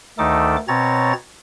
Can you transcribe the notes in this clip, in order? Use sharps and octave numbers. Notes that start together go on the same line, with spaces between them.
D2 D#3 A3 D#4 A4 D6
B2 C4 C#5 A#5 A6